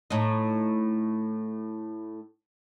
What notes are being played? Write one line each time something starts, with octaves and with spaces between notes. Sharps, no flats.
A2 D#4